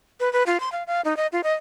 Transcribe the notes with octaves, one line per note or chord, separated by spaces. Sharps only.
B4
B4
F4
C6
F5
F5
D#4
D#5
F4
D#5